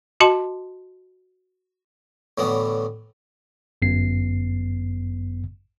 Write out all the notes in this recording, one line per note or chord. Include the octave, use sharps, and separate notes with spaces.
F#4 D#5 A5 C6
A2 D3 E3 F#3 B3
G1 F#2 B3 C7